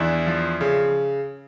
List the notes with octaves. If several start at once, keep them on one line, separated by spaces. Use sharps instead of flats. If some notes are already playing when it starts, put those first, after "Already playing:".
Already playing: E2 D4 E4
F3
C#3